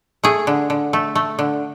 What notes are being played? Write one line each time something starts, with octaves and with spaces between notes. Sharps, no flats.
A3 G#4
D3
D3
A3
A3
D3